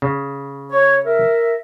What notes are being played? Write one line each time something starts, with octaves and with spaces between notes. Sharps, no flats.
C#3
C#5
A#4 E5